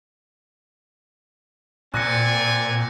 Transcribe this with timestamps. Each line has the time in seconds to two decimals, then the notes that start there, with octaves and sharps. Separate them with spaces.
1.94 A#2 C4 D5 G#5 F#6 A#6 C#7